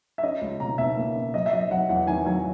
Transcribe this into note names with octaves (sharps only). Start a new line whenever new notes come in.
E5
C#4 D#5
C#2
B2 A#5
B2 E5
A#3
C#4
F#3 D#5
E5
F#3 D#5
F#3 F#5
E2 F#5
D#3 G#5
F#3 G#5